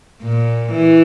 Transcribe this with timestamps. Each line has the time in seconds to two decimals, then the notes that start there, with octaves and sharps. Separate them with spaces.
0.22 A#2
0.72 E3